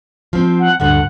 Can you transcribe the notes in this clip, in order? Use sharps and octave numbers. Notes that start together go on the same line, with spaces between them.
F3 C4
F#5
D2 G2 D3 F#5